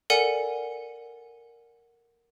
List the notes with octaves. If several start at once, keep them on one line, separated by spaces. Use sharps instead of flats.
A4 A#4 D5 F#5 G#5 C#7